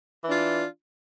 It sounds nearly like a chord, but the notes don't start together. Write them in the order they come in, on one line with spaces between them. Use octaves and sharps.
E3 D4 F4